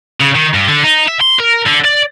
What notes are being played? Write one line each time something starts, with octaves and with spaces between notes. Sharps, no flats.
C#3
D#3
G2
D3
D#4
E5
C6
A#4
D3
D5